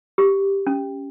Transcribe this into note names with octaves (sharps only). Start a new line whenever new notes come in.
G4
C#4